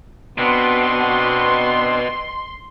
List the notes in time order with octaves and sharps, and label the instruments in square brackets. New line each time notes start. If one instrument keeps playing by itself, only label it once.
[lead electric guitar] B2 [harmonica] B3 [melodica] C4 D4 [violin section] C6